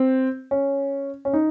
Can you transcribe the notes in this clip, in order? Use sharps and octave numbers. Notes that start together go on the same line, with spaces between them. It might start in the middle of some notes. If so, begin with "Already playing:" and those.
Already playing: C4
C#4
C#4
D#4